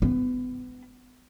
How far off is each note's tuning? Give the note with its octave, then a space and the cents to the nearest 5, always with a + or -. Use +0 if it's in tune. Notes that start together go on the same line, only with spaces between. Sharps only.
B3 +30